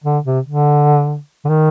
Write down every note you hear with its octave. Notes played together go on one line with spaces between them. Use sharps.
D3
C3
D3
D3
D#3